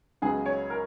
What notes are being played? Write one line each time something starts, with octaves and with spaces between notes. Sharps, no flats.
C#2 C#3 F#3 B3 G#4
C#5
A#4